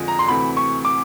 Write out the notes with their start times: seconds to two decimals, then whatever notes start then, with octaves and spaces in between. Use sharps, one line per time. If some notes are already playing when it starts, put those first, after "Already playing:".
Already playing: F2 D3 F3 G#3
0.08 A#5
0.19 C6
0.28 D2 C3 E3 A3 B5
0.57 C#6
0.85 D6